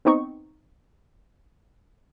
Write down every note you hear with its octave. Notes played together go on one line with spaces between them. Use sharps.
B3 C4 D#4 C#6